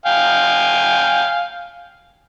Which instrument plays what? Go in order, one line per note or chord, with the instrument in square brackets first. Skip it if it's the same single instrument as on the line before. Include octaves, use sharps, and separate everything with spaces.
[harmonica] F5 G5 G#5